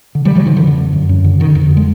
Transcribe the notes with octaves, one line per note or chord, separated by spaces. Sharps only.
D3
F3 G3
D3
E3 F#3
D3 D#3 F3
D3 E3
F2
D3
D3
F#2
F#2
D3
D3 D#3
F2
D3
G#3